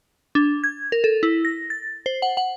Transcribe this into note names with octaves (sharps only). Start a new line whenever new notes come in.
D4
G#6
A#4
A4
E4
A#6
A6
C5
F#5
F#5